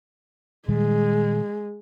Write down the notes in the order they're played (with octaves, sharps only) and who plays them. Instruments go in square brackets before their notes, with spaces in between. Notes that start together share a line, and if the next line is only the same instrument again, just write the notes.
[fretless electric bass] A#2 D#3 G3 [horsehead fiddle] G#3